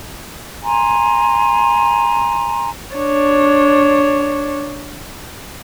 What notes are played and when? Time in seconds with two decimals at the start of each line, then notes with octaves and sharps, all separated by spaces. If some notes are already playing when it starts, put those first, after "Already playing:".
0.64 G#5 A#5 C6
2.95 D4 C#5